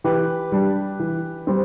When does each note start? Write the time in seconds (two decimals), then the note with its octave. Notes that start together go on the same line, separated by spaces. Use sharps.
0.04 E3 G4 B4
0.52 G3 D4
1.00 E3
1.47 G3 C4